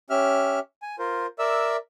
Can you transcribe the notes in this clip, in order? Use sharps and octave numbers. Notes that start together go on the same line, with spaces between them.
C#4 G4 E5 F6
G#5
F4 A#4 C5
A#4 D5 E5 E6